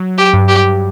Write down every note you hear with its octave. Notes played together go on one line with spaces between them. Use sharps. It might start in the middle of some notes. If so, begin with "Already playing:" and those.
Already playing: F#3
G4
G2
G4